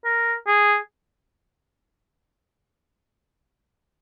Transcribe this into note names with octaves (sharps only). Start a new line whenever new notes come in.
A#4
G#4